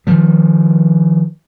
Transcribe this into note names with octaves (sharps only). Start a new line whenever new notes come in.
D#3 F3 G3